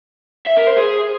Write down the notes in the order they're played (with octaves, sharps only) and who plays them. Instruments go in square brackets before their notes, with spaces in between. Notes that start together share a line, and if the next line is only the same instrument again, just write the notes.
[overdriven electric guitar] E5
A#4
C5
G#4